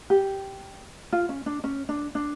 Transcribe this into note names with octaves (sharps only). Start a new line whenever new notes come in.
G4
F4
C#4
D4
C#4
D4
D4